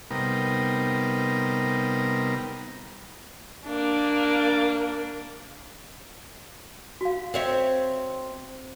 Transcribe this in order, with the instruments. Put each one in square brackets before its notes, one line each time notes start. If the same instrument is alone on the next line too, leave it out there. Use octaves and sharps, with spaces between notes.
[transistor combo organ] C3 G3 B3 D#4 A#4
[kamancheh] A#3 D4
[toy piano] F#4 F5
[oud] C4 C#5 E5